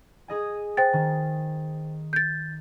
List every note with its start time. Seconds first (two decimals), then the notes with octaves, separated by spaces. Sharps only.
0.28 G#4 D#5 G#5
0.77 C5 G5 A6
0.93 D#3
2.13 G6 A6